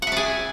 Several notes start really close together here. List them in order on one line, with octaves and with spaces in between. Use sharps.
F#5 E5 D5 G#4